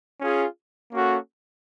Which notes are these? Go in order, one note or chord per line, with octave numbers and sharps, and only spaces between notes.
C#4 F4 G#4
A#3 C#4 F#4 A4